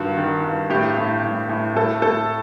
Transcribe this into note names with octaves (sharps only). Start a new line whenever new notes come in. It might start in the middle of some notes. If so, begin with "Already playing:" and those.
Already playing: G2 D#3 F#4
D#3
G2
A2 G4
A2
A2
A2
A2 A4
A2 A4